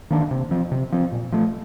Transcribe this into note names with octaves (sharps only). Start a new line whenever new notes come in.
D#3 A#3 D4
C3
F3 C4
C3
F3 C4
A#2
F3 A3